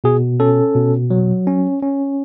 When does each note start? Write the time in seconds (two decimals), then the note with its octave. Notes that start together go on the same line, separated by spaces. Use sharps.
0.04 B2 G#4
0.40 C#4 A4
0.75 B2
1.10 F#3
1.47 C#4
1.83 C#4